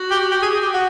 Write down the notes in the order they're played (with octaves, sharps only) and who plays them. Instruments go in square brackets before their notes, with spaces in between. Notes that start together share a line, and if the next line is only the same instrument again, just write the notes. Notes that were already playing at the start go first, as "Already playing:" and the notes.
Already playing: [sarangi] F#4
[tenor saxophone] G4
G4
G#4
G#4
G4
F#4